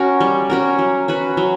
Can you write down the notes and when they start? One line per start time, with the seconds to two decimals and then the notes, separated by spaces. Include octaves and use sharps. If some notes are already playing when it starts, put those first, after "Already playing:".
Already playing: C#4 F#4 A#4
0.20 G3
0.50 C#4 F#4 A#4
0.79 F#3
1.08 C#4 F#4 B4
1.37 F#3